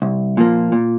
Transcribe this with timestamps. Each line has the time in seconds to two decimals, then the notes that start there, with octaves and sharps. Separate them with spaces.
0.02 C2
0.37 A#2 F3 A#3
0.72 A#2